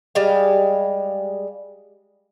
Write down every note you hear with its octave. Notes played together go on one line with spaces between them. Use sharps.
G3 G#3 F5